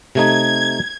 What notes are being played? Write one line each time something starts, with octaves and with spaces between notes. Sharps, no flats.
C3 A3 D#4 G#6